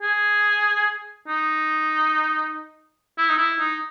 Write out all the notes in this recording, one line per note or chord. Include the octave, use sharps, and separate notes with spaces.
G#4
D#4
E4
D#4
E4
D#4